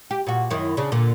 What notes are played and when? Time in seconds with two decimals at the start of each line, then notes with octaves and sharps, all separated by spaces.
0.11 G4
0.27 A#2 F#4
0.50 F#2 D#3 E4
0.77 C#3 D4
0.92 A#2 D3